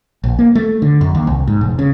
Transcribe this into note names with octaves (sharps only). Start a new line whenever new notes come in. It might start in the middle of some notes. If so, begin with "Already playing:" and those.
A#1
A#3
A3
D3
F#2
D#2
C2
G#2
E1
C#3